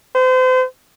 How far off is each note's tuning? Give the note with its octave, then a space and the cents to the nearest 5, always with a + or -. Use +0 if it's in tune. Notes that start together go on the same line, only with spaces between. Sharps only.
C5 -35